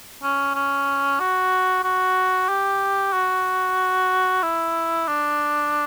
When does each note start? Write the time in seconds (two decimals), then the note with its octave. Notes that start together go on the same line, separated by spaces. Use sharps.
0.23 C#4
0.55 C#4
1.20 F#4
1.84 F#4
2.49 G4
3.13 F#4
4.43 E4
5.08 D4